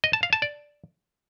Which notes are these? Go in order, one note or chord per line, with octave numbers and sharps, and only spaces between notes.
D#5
A5
F5
A5
D5